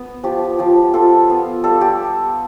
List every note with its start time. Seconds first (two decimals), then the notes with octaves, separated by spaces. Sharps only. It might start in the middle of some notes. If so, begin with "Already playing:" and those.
Already playing: B3
0.23 F3 G4
0.59 F3 G4
0.94 F4 A4
1.30 B3
1.64 G3 A4
1.81 G4